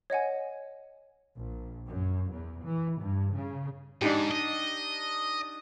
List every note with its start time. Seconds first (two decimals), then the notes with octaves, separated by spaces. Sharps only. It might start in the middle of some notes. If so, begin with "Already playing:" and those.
0.10 C#5 D#5 F#5 G#5
1.36 A#1
1.88 F#2
2.32 E2
2.65 E3
3.00 G2
3.35 C#3
4.02 G#2 D4 D#4 G4
4.31 D#5